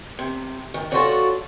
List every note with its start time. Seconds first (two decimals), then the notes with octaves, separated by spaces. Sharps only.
0.19 C3
0.74 D#3
0.91 F4 F#4 A4 C#5 D5 F#5